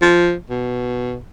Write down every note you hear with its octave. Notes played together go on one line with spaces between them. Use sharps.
F3
B2